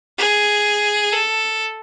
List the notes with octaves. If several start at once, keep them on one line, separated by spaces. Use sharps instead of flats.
G#4
A4